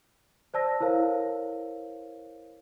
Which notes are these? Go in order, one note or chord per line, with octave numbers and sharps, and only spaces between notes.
C5 D5 A5 E6 A#6
E4 A4 A#4 C5 C#5 F5